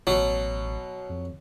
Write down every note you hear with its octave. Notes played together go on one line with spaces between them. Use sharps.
A1 B2 F#3
F2